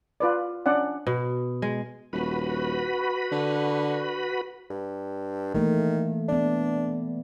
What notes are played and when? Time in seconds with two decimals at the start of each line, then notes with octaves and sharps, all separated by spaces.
0.20 F4 B4 D5
0.66 C#4 D4 D5 F#5
1.07 B2
1.62 G#3
2.13 D#1 F#4 B4 B5
3.32 D3
4.70 G2
5.54 D#3 E3 A3 A#3
6.28 B3 D4 D5